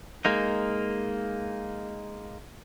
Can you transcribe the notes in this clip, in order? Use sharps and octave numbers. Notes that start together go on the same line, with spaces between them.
G#3 A#3 D#4